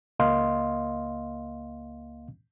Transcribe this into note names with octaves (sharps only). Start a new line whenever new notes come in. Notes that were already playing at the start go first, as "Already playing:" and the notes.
C#2 A#3 D#5 F5 C6